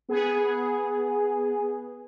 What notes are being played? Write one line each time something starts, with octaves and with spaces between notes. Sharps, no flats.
B3 G#4